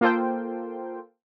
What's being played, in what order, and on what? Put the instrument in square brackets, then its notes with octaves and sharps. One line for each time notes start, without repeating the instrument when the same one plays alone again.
[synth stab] A#3 F4 A4 C5 G5